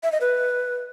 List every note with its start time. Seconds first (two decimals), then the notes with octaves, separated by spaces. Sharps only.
0.03 E5
0.12 D#5
0.21 B4